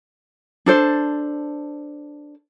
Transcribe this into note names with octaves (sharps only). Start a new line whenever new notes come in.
D4 A4 C5